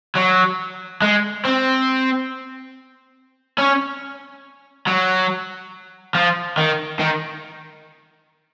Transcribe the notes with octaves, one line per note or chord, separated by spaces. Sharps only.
F#3
G#3
C4
C#4
F#3
F3
D#3
D#3